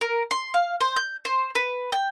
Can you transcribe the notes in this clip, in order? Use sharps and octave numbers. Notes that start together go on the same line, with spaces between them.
A#4
C6
F5
C5
G6
C5
B4
G5